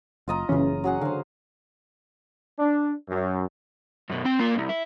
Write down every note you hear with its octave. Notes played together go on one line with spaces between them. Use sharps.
F#1 F4 D#5 A#5
F#1 C#3 E3 C#4
F#3 G#4 F#5
D3 C5 F5
D4
F#2
F#2 B2
C4 G5
A#3 F4
C2 G#2
E4